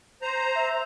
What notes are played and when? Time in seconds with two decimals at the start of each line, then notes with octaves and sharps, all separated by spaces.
0.22 C5 A#5
0.55 E5